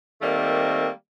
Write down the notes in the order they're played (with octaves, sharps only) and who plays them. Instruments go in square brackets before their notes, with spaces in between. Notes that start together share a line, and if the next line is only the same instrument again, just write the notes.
[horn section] D#3 G3 A3 A#3 C4